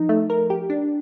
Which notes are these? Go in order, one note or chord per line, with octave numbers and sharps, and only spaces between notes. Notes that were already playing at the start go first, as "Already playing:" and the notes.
Already playing: F3 D#4
A3
A#4
G4
D4